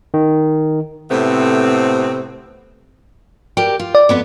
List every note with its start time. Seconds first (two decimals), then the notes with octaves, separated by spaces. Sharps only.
0.14 D#3
1.10 A2 C3 A3 B3 C4
3.57 G4 A#4 D5
3.79 F4
3.95 D5
4.09 F2 B3 B4